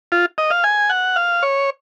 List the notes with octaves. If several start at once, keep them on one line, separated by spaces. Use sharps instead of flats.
F4
D#5
F5
G#5
F#5
F5
C#5